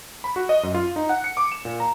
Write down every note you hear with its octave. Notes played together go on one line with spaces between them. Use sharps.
B5
F#4
D#5
F#2
F4
D#4
F#5
C#7
D6
E7
A#2
A#5